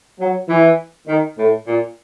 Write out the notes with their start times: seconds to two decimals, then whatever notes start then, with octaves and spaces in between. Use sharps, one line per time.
0.19 F#3
0.48 E3
1.07 D#3
1.38 A2
1.67 A#2